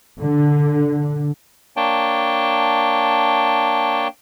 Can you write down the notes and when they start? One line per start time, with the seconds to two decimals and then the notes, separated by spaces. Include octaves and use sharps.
0.19 D3
1.77 A#3 D4 C#5 G5 A5